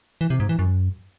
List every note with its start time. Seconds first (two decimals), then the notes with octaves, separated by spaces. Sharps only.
0.21 E3
0.30 C3
0.40 G#2
0.49 E3
0.59 F#2